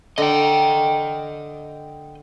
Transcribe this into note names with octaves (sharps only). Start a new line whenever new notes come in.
D3 D#5 G5